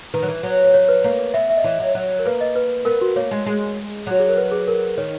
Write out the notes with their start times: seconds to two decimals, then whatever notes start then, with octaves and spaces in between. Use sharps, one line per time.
0.14 D#3 B4
0.23 F#3
0.29 E3
0.43 F#3
0.74 C#5
0.89 B4
1.04 A#3 C#5
1.34 B3 E5
1.50 E5
1.57 D#5
1.64 E3 C#5
1.80 F#3
1.95 F#3
2.19 A#4
2.26 A#3 B4
2.41 D#5
2.56 B4
2.85 B3 A#4
3.01 F#4
3.16 A#3 C#5
3.31 G#3
3.46 G#3
4.07 F#3 F#4
4.19 G#4
4.29 A#4
4.37 B4
4.52 G#4
4.68 A#4
4.97 D#3 C#5